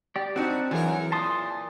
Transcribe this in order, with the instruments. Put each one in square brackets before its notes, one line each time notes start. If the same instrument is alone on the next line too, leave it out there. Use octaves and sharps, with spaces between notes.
[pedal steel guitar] G4 D5
[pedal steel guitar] C4 D4 [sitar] D#4 F#4
[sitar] E3 A#4 [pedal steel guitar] F#3 G#4
[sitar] A#2 [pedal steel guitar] A5 C6 D#6